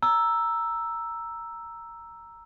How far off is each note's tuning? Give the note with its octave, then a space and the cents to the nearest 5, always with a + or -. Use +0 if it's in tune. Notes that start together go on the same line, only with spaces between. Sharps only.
A#5 +0 E6 +0